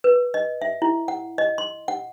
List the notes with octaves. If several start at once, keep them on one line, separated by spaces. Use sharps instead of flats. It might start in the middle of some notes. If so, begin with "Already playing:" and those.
B4
D#5
E5
E4
F#5
D#5
C6
F#5